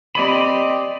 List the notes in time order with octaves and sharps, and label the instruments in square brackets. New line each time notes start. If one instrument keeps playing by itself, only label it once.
[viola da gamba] C4 G4 D5 [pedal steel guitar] D#5 B5